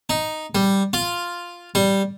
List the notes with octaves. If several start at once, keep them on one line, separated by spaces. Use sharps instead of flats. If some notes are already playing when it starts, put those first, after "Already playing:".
D#4
G3
F4
G3